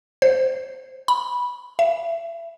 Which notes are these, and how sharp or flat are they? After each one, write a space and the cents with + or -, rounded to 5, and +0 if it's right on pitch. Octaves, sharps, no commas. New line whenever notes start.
C5 -5
B5 -10
E5 +25